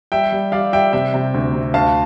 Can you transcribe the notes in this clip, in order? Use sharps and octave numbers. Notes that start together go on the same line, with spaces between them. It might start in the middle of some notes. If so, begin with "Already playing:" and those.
G3 E5 G5
G3
G3 D5 F5
G3 E5 G5
C3 E5 G5
C3
D2
C3
D2 F5 A5